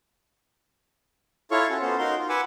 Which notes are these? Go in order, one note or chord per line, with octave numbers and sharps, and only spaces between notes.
E4 F4 A4 C#5 F5 C#6
C#4 F4 F#4 A4
B3 C#4 A4 C5
D#4 F#4 A#4 F5 C6
F4
B4 F#5 G#5 D6 E6